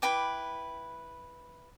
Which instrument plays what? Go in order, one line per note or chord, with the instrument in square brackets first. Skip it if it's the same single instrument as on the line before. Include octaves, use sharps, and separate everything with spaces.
[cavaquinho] E4 B4 G5 D6